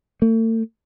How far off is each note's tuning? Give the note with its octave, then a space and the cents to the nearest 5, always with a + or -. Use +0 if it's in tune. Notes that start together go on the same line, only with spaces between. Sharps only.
A3 +40